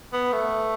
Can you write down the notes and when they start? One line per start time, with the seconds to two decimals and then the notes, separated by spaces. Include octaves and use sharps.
0.13 B3
0.33 A3